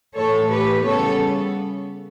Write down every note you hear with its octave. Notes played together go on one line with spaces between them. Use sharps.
A2 E3 A3 A4 C#5
G4 B4
C#3 G3 B3 A4 C#5